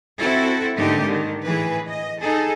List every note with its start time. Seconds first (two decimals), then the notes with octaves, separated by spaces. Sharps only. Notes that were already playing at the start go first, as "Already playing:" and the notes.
0.18 C4 E4 F#4 A4
0.76 G#2 D3 A3 A#3 D#4 G4
1.05 D3 D#3
1.44 A2 E3 G#4 B4
1.87 D#5
2.19 D#4 G#4 A4